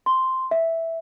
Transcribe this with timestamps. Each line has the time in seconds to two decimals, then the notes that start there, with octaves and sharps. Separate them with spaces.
0.06 C6
0.51 E5